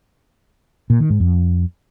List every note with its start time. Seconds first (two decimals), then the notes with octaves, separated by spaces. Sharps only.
0.90 A#2
1.00 D#3
1.10 G#2
1.20 F2